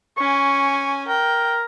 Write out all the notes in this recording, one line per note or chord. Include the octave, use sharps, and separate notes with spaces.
C#4 G#5 C#6
A#4 G5